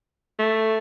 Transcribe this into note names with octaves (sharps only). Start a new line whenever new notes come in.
A3